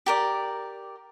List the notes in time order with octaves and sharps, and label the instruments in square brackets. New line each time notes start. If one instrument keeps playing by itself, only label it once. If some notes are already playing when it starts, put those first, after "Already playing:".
[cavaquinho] G4 A#4 D5